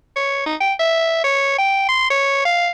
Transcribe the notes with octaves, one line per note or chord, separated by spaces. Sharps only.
C#5
D#4
G5
E5
C#5
G5
C6
C#5
F5